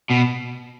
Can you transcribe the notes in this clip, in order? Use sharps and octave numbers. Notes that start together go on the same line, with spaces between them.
B2